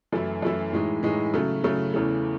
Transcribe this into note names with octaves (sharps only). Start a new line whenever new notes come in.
F#2 E3 A3 E4
F#2 E3 A3 E4
A2 E3 G#3 D#4
A2 E3 G#3 D#4
C#3 F#3 A3
C#3 F#3 A3
E2 C#3 E3 A3